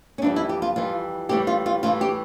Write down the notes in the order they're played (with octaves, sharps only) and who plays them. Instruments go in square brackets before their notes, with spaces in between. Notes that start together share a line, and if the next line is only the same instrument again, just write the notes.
[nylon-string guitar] C#4
F2 E3 G3 D4
E4
G4
F4
F2 E3 G3 F4
A2 E3 G3 G4
F4
F4
A2 E3 G3 F4
G4